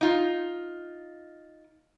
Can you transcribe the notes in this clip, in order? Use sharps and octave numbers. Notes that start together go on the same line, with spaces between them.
D#4 F4